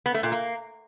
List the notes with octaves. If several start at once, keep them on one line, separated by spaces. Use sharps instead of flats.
B3
A3
A#2
A#3